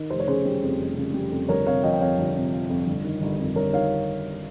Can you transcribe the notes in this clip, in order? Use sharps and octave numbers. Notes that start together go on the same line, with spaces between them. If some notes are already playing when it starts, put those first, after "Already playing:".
Already playing: D#3
F1 C5
C#5
C#3 G#4 C5
G3
F2
F1
C#3
G3
F2
G1 A#4 C#5
C3 C#5 F5
F3 D#5 G5
G5
F2 C#5 F5
G1
C3
F3
F2
G1
D#3
G1
F2
G1 A#4 C#5
D#3 C#5 F5